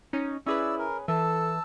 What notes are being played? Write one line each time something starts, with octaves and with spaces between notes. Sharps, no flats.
C#4 D#4
C#4 E4 G#4 B4 D5 E6
A#4
E3 A4 A5 E6